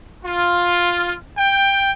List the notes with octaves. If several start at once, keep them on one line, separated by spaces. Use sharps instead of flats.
F4
G5